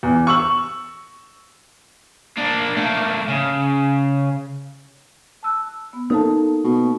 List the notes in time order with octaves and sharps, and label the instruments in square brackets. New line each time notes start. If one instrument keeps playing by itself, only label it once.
[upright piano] E2
C#6 E6 F#7
[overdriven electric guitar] A#3 D4
A3 A#3
C#3
[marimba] A5 E6 F#6
B3
[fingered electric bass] A#3 [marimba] D#4 A4 A5
[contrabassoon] B2